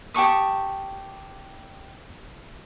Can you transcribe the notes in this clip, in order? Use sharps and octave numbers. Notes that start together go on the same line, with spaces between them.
G4 A5 C#6 D#6